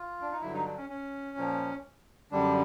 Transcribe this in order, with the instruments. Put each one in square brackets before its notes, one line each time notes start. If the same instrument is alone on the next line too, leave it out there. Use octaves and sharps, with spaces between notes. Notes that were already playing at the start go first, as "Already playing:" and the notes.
Already playing: [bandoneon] F4
D4
D#4
G2 D3 F#3 E4
D#4
D4
C#4
C#4
A#2 F3
F#2 D3 G3 D4